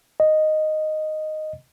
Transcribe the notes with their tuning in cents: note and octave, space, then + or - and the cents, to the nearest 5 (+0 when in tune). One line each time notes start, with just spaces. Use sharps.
D#5 -5